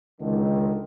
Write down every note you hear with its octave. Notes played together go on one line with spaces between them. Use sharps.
C#2 D3 D#3